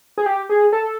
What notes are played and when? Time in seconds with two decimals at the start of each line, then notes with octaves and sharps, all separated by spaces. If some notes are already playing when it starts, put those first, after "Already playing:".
0.18 G#4
0.26 G4
0.49 G#4
0.73 A4